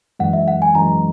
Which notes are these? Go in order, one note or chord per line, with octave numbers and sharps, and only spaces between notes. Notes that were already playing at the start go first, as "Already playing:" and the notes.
F#2 E3 G#3 F#5
E5
F#5
G#5
F#2 E3 G#3 A#5